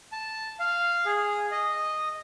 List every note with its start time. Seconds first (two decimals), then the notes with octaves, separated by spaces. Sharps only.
0.12 A5
0.59 F5
1.06 G#4
1.51 D#5